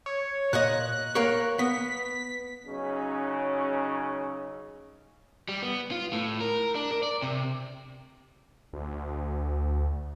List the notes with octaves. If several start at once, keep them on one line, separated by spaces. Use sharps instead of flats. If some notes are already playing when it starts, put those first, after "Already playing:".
C#5
A#2 C#5 D#5 F#6
A#3 A#4 C#5
B3 B6
C#3 F#3 C#4 D#4
G3
B3
F4
A2
A#4
D4
A#4
D5
C3
D2